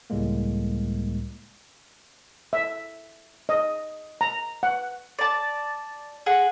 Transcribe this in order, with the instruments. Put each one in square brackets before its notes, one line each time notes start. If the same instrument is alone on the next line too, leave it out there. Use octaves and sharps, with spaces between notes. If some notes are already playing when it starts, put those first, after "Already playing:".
[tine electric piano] C#2 A2 G3 G#3 A#3
[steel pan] E5
D#5
A#5
F#5
[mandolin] D5 A5
G#4 F#5